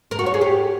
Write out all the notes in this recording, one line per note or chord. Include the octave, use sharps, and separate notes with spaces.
A#4
F#4
C#5
G#4
G4